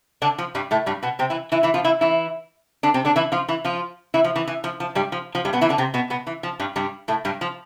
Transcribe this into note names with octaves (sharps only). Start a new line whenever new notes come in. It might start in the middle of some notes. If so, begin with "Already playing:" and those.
D3 D4
F3
G2 G3
A2 A3
G2 G3
B2 B3
C3 C4
E3 E4
E3 E4
E3 E4
F3 F4
E3 E4
E3 E4
D3 D4
C3 C4
D3 D4
E3 E4
F3 F4
E3 E4
F3 F4
E3 E4
F3
E3
E3
F3
F3
G2 G3
F3
F3
G2 G3
B2 B3
E3 E4
D3 D4
C3 C4
B2 B3
B2 B3
E3
F3
G2 G3
G2 G3
A2 A3
G2 G3
F3